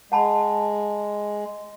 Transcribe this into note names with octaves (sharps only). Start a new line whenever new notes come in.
G#3 F#5 A5 B5